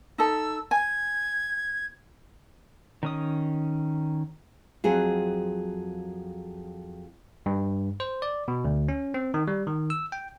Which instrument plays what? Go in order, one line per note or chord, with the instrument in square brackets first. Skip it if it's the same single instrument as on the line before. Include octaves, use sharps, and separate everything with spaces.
[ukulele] D#4 A4 [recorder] E6
[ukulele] G#5 [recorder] G#6
[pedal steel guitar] D#3 C#4 D#6
[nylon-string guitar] F2 F#3 G#4 C5 F5 F#5
[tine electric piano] G2
C5
D5
B2
D2
C#4
C4
D#3
G3
D#3
E6
G5